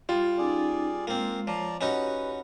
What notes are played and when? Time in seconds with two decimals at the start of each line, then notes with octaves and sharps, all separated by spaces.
0.09 G3 F4
0.38 C#4 D#4 G#4 D5 D6
1.07 G#3 A#3 C4
1.47 F3 C#5 D5 A#5
1.81 C#4 D#4 F#4 G4 B4